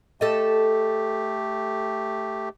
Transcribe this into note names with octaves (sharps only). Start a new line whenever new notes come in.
A3 G4 A4 D#5